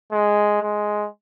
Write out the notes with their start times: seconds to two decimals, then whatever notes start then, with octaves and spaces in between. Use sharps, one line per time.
0.12 G#3
0.62 G#3